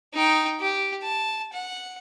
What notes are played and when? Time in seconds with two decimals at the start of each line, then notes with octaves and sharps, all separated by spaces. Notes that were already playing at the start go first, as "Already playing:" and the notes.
0.14 D#4 G5
0.60 G4
1.02 A5
1.53 F#5